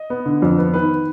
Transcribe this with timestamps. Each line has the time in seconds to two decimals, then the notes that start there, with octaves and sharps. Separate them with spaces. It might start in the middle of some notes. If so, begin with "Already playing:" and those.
Already playing: D#5
0.10 B3
0.26 D3
0.42 F2
0.58 B3
0.74 D#3 B4